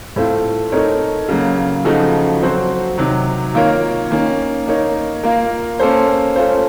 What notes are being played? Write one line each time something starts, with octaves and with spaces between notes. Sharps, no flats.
A2 A3 C4 F4
A3 C4 D#4 A#4 C#5
C#3 F#3 A#3
C#3 F3 A3 D#4 F#4
F#3 C4 F#4 C5
C3 D#3 F#3
D#3 A#3 F4 A#4 C#5
D#3 A#3 C#4
A#3 D#4 A#4 C#5
A#3 F4 A#4
A#3 C#4 A4 C5
A3 C#4 F4 C5